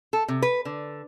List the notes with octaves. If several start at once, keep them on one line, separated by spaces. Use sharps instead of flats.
A4
C3
B4
D3